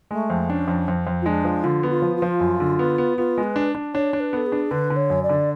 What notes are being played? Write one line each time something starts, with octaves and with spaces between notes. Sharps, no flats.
G#3 A3
F2
C#4 D4
F2
F2
F2
F4
G#3 D4
F3
D3 F4
B3
F4
F3
F4
F3
F#2
D3
B3
B3
B3 F4
G#3
B4
D4
D4
D4 C#5
D4
B4
B3 A4
G#4
D4
D3 B4
D3
C#5
F#2
D5
D3